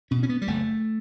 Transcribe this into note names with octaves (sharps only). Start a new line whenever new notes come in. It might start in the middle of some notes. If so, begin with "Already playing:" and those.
B2 C#4
C#4
B3
G3
F#1 A3